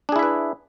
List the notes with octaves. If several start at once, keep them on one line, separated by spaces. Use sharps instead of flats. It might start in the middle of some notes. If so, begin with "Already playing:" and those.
D4 E4 G#4 B4 E5